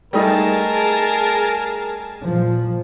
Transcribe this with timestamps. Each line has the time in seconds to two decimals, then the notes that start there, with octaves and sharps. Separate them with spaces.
0.13 G3 A3 D#4 G#4 A#4 A5
2.25 A#2 F3